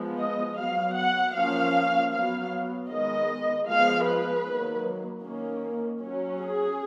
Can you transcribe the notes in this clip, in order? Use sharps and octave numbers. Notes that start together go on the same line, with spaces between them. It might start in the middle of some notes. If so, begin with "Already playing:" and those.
Already playing: F3 G#3 B3
D#5
F#3 B3 F5
F#5
F3 A#3 C#4 F5
F#3 B3 F5
D#3 G#3 B3 D#5
F3 G#3 B3 F5
B4
D#3 F#3 A#3
D#3 A#3 C#4
F#3 C#4
G#4